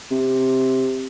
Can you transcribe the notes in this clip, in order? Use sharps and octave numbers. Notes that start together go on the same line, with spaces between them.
C3